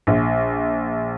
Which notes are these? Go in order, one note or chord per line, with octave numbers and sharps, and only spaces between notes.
A#1